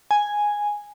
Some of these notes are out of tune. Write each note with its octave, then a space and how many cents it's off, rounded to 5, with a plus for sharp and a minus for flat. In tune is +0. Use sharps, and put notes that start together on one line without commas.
G#5 -5